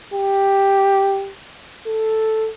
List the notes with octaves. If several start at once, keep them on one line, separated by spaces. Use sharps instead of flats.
G4
A4